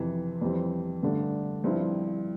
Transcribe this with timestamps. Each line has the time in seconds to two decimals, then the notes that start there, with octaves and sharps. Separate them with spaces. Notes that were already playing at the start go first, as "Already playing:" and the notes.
Already playing: F2 C3 E3
0.41 F2 E3 G3 C4
1.03 G2 D3 A3 D4
1.64 G2 F3 C4 E4